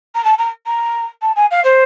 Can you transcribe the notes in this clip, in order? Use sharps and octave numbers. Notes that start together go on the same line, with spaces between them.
A#5
A5
A#5
A#5
A5
G#5
F5
C5